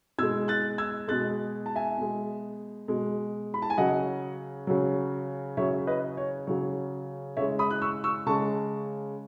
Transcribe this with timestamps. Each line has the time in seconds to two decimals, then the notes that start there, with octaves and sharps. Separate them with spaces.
0.18 B2 E6 G#6
0.23 G#3
0.48 F#6 A6
0.78 E6 G#6
1.08 B2 G#3 F#6 A6
1.66 A5
1.75 E5 G#5
1.98 B2 G#3
2.88 B2 G#3
3.54 B5
3.62 A5
3.70 G#5
3.77 C#3 F#3 D#5 F#5
4.67 C#3 F#3
5.57 C#3 F#3 C#5 E5
5.87 B4 D#5
6.17 C#5
6.47 C#3 F#3 C#5
7.37 C#3 G#3 C#5 E5
7.59 B5 D#6
7.71 F#6
7.82 C#6 E6
8.04 C#6 E6
8.26 C#3 G#3 A5 C#6